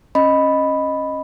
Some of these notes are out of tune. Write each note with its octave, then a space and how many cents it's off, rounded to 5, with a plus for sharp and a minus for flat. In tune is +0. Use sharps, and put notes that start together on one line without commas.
C#4 -20 D#5 +0 B5 +0